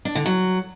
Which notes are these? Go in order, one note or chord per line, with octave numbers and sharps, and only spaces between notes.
D4
D3
F#3